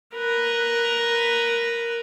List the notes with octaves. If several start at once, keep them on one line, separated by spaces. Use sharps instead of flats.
A#4 B4